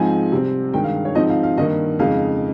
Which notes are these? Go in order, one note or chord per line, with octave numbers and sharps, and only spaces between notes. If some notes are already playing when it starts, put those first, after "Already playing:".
Already playing: G#2 F3 G#3 C4 D#4 G#5
C3 G3 C4
G2 D#3 G#3 G5
F5
C#5
G#2 F3 C4 D#4 D#5
F5
F5
G2 D#3 A#3 D#5
F2 C#3 G#3 D#4 F5